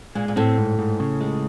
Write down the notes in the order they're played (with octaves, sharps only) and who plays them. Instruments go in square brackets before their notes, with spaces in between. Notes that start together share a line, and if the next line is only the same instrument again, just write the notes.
[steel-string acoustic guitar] A#2 [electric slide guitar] G#3
[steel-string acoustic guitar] A#2
[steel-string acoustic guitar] A2 [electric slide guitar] C4
[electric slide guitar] G#2
G#2
C#3
G#3